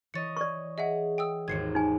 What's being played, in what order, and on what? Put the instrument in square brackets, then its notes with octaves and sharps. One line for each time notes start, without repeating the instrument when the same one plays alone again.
[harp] E3 C#5 D#5 [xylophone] A6 C#7
[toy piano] D5 C#6
[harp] G#4 [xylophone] D#5 E5 F#5
[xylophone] G5 D#6 E6
[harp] G#1 D#2 [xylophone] G#6 C7 C#7
[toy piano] D#4 G#5